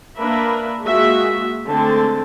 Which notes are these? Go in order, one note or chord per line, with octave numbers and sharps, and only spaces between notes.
A#3 D4 A#4 B4 E5 B5
G#3 A#3 F4 F#4 G#4 E5
D3 G#3 A3 C4 A4 A5